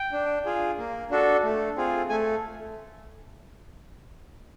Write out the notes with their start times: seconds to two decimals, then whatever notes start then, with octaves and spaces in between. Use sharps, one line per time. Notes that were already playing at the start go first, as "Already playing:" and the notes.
Already playing: G5
0.12 D4
0.45 F4 G#4
0.78 A#3
1.11 D4 F#4 A4
1.43 A3
1.77 C4 F4 G#4
2.09 A3 G#5